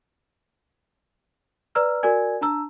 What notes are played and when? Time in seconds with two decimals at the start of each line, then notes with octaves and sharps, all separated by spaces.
1.75 B4 D5 A#5 E6 F6
2.03 F#4 A#4 D5 G#5 G#6
2.41 D4 A5 A#5 E6